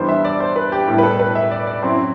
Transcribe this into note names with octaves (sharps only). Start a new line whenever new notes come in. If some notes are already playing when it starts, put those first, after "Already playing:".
Already playing: G2 E3 G3 B3 C5
E5
D5
C5
B4
G4
A2 G3 B3 E4 G4
B4
A4
B4
E5
D5
D5
F#2 F#3 C4 E4 C5